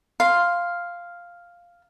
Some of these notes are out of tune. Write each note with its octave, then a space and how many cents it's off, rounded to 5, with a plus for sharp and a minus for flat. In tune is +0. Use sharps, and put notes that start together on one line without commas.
F5 +0 C6 +0